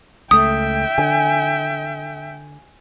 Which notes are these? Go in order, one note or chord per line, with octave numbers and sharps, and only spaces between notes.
C#2 A3 E5 G5 D#6
D3 G#5